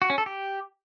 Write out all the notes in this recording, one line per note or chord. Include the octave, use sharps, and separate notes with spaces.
F#4
C#4
A4
G4